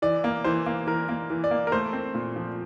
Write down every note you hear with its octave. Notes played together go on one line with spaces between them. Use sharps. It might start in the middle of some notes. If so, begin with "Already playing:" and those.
E3 D5
A#3
E3 C5
A#3
E3 A#4
A#3
E3
D5
A#3
A#4
A3 C5
C4
A#2
F3